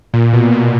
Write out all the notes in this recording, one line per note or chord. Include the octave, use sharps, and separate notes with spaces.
A#2
B2
A#2